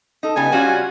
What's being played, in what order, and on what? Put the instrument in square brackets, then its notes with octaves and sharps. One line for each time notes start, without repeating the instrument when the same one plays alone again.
[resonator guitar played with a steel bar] D#4 A4
[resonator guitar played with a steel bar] C#3 G3 B3 [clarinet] G#5
[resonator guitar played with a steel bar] G3 C#4 F4 [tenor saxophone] F#4